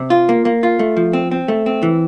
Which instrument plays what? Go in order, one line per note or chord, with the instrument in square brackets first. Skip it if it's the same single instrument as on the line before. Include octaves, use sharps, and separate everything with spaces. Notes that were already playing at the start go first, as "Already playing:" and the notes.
Already playing: [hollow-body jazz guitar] C3
F4
A#3
A#3
F4
A3
F3
C4
C4
A3
C4
E3